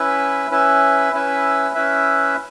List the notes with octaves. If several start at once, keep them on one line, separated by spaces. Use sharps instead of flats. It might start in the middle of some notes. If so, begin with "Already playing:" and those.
Already playing: C#4 E4 B4 E5
C#4 E4 B4 E5
C#4 E4 B4 E5
C#4 E4 B4 E5